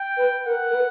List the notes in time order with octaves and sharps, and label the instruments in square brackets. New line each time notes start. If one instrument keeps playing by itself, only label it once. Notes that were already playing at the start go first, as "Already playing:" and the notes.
Already playing: [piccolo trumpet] G5
[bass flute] B4
[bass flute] A#4 [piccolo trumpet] F#5
[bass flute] A#4
B4